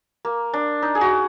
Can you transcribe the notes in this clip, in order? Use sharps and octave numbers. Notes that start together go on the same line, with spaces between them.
A#3
D4
D#4
G#4
F#4